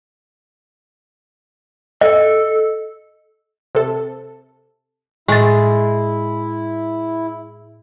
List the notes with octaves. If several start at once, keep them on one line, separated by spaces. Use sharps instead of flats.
A4 D#5
C3 A4
A2 G#3 E4 A6